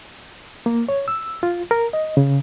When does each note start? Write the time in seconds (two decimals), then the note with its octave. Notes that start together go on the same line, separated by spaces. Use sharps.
0.66 A#3
0.89 C#5
1.08 E6
1.43 F4
1.71 A#4
1.93 D#5
2.17 C#3